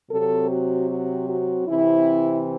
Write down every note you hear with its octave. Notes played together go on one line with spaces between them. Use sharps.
C3 F#3 C4 A4
F#4
F#4
F#4
C3 E3 C4 E4